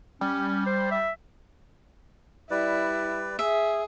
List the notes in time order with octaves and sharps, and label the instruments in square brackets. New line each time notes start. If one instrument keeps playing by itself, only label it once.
[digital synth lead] G3 [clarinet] C#4
[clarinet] C5
E5
[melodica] G3 B4 D5 [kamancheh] E4
[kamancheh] G#4 [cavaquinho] E5